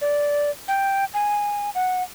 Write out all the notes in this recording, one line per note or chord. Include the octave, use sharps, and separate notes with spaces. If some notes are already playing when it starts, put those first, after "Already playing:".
D5
G5
G#5
F#5